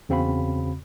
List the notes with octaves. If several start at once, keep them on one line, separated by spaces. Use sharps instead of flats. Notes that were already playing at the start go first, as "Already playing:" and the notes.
E2 C#3 C4 F#4 F5 B5